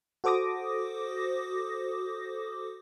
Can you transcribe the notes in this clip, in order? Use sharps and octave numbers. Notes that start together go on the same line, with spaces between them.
F#4 A4 C5 D6 D#6 A#6